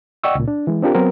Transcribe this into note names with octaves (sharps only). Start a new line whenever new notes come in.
D5 D#5 F#5 G5 C#6 E6
C#2 A#2
D4
E3 G#3
C4 D4 F4 G4 A#4
F#3 B3 C4 A#4